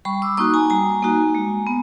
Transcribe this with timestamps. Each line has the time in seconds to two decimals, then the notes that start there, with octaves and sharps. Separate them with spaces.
0.05 G3 B5 C#6
0.22 D6 E6
0.37 A#3 D#4 F#4 C#6 D#6
0.54 G#5 A#5
0.70 G3 G#5 A#5
1.02 A#3 D#4 F#4
1.35 G#3
1.67 B3